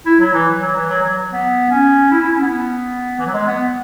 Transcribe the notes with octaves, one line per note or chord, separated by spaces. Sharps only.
E4
F#3
E3
F#3
E3
F#3
F#3
B3
C#4
E4
E4
C#4
B3
E3
F#3
G#3
B3